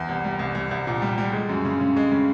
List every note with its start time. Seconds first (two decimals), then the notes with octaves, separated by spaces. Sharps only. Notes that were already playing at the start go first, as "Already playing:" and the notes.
Already playing: E2
0.09 C2
0.24 G3
0.39 C2
0.55 C2
0.71 C2
0.87 A#2
1.02 G3
1.18 G3
1.33 G#3
1.49 F#2
1.65 C#3
1.80 C#3
1.96 G#3
2.12 C#3